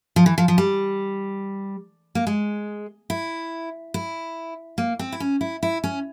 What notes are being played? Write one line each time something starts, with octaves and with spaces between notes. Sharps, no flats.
F3
E3
F3
F3
G3
A#3
G#3
E4
E4
A#3
C4
E4
C#4
E4
E4
C#4